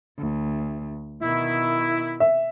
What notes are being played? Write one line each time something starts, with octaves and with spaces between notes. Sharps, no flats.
D2
B2 D#3 E4
E5